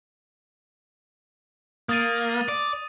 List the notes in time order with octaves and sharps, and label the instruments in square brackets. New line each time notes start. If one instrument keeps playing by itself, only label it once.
[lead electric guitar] A#3 [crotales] D#6 A6 D#7
[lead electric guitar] D5